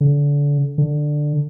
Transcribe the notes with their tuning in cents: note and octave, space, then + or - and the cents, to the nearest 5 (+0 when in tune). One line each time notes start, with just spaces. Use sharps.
D3 -30
D3 +10